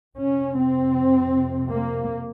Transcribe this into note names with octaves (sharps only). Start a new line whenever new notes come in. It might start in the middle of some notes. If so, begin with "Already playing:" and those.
F2 C3 C#4
C4
A#3